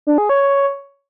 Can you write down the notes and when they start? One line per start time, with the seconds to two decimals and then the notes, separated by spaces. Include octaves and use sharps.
0.07 D4
0.18 G#4
0.29 C#5